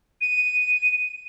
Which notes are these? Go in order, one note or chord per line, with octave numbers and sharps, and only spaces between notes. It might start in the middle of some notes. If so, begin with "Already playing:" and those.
D#7